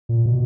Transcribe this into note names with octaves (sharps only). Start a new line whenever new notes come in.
A#2
B2